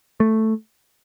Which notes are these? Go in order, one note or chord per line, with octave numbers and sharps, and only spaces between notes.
A3